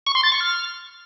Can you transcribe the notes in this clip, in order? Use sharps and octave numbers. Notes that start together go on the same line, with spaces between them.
C#6
C6
A6
C#6
F6